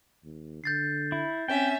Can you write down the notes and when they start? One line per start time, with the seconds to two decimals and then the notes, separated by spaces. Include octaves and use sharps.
0.24 D#2
0.64 D3 G6 A6 C7
1.12 E4
1.48 C4 C#4 E5 G5